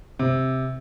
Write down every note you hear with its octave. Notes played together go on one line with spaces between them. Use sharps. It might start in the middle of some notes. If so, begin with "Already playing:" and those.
C3